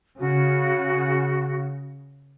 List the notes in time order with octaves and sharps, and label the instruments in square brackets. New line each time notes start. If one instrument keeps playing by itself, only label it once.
[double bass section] C#3 [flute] F#4